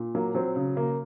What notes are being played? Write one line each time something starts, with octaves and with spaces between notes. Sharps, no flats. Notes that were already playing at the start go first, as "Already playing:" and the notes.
Already playing: A#2
F#3 A#3
F#3 C4
C#3
C#3 A#3